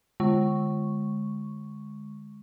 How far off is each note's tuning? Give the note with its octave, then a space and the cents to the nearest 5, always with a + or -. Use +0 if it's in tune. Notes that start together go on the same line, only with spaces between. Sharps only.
D3 +15 G#3 +0 C#6 +0